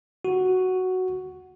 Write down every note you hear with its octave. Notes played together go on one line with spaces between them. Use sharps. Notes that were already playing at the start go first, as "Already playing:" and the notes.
F#4